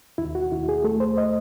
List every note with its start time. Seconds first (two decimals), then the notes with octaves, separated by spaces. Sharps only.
0.18 D#2 E4
0.35 F#4
0.52 D#2 E4
0.69 G#4
0.84 A3 A4
1.00 C5
1.18 D#5